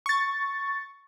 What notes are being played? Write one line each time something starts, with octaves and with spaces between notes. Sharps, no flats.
C#6 A6